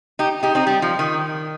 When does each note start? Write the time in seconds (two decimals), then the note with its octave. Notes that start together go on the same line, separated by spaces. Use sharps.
0.19 D#4 G4
0.43 D#4 G4
0.55 C4 D#4
0.67 G3
0.82 F3
0.99 D#3